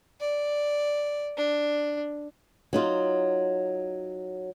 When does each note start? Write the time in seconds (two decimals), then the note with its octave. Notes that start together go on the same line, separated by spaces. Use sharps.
0.21 D5
1.37 D4
2.73 F#3 D#4 F4